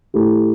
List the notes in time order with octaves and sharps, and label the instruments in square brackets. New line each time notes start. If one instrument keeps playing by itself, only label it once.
[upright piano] A2 A3 E4 G4